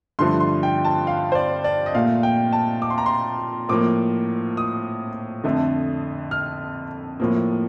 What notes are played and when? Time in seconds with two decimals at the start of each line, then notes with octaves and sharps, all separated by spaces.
0.19 G2 D3 F3 A3 C6
0.40 C6
0.63 G5
0.85 A5
1.07 F5
1.32 C5
1.35 D5
1.64 D5
1.86 D#5
1.95 A#2 A3 F5
2.23 G5
2.53 A5
2.82 D6
2.90 C6
2.98 A#5
3.06 C6
3.69 A2 F3 A#3 D6
4.57 D#6
5.44 F2 D3 A3
6.31 F6
7.20 A2 F3 A#3